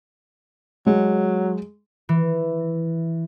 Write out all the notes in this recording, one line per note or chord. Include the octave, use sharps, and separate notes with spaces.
F#3 G#3
E3